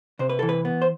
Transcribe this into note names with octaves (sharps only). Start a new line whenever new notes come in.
C3 C5
B4
E3 A4
B4
B3
C5